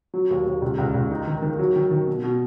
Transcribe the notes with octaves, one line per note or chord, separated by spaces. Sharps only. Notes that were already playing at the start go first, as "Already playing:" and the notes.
F#3
D#2
D#2
C#2
C#2
C#2
D#4
D#3
D#3
F#3
D#3
D#3
B2
B2